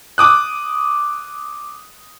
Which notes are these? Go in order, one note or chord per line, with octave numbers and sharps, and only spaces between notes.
D6 D#6 F#6